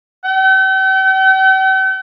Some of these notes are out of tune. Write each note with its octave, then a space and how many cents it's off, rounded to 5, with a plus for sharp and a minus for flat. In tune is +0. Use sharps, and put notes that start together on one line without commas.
G5 -45